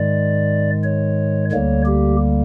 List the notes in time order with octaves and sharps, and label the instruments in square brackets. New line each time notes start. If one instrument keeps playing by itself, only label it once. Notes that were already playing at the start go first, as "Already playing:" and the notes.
Already playing: [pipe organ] G#2 D#3 G#3 D5
C#5
D2 D3 G3 A#3 C#5
G4